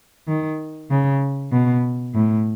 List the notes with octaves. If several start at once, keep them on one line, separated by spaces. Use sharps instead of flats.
D#3
C#3
B2
A2